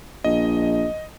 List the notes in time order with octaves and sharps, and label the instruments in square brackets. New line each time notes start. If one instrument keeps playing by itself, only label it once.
[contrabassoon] A#1 [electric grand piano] D#5